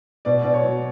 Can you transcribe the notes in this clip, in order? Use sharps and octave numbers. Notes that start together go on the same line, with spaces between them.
B2 D5
B2 D5
C#5
F#3